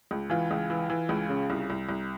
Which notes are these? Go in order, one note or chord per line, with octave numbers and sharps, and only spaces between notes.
C#2
E3 F4
C#2
E3
E3
C#2
C#3
C2
C2
C2